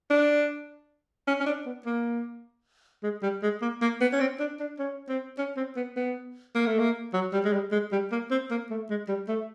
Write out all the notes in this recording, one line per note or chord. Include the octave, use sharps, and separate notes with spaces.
D4
C#4
C#4
D4
B3
A#3
G#3
G3
G#3
A#3
A#3
B3
C#4
C4
D4
D4
C#4
C4
C#4
C4
B3
B3
A#3
A3
A#3
F#3
G3
G#3
G3
G#3
G3
A#3
C4
A#3
A3
G#3
G3
A3